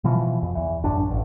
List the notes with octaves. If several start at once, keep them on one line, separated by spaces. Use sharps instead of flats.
B2 E3 F3
F2
E2 E3
A1 F#2 D4
A1